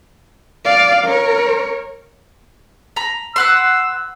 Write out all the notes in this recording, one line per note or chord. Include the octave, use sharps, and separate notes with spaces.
D5 F5
A#4 C#5
A#5 B5
B4 F#5 C6 E6